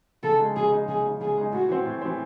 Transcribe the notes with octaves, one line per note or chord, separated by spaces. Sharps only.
C#3 A4
G#3 D#4
C#3 G#4
G#3 D#4
C#3 G#4
G#3 D#4
C#3 G#4
G#3 D#4
A2 F#4
E3 C4
A2
E3 C4